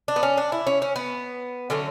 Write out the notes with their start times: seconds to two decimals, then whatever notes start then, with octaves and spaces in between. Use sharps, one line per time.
0.08 D4
0.16 B3
0.23 C#4
0.37 D4
0.52 E4
0.67 C#4
0.82 C#4
0.96 B3
1.70 D3 F#3 A3 C#4